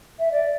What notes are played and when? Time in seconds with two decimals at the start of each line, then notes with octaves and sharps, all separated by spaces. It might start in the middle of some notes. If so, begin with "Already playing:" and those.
0.19 E5
0.32 D5